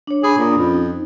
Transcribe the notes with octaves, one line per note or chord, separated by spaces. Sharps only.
D4 C#5
D4 G#4 B5 D#6
A#2
F2 C#4 F4
D#4